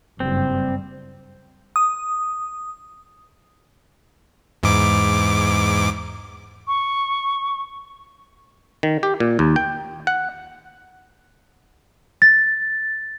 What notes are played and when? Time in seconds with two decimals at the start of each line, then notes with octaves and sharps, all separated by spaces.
0.20 F#1 G2 G3 C4
1.76 D#6
4.63 E2 G#2 D6
6.68 C#6
8.83 D#3
9.03 G4
9.20 A#2
9.39 D#2
9.56 G5
10.07 F#5
12.22 A6